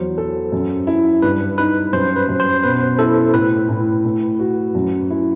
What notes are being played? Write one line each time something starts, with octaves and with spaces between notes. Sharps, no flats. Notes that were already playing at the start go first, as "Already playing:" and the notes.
Already playing: E2 F#3 C5
A4
F#2
E4
G2 B4
D#4 B4
F#2 C5
B4
F#2
C5
B2 B4
E4 A4
A2 B4
A2
A2
F#4
F#2
E4